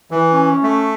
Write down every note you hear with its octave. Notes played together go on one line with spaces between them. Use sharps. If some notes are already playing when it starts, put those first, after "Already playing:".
E3
C#4
A3